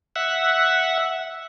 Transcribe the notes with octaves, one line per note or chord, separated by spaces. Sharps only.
E5 F#5